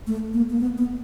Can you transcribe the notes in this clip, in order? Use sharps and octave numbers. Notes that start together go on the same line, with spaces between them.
A3
A#3
A#3
B3
B3